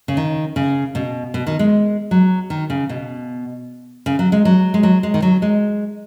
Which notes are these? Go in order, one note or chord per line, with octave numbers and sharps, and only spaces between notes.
C#3
D#3
C#3
B2
B2
D#3
G#3
F#3
D#3
C#3
B2
C#3
F#3
G#3
F#3
G#3
F#3
G#3
D#3
F#3
G#3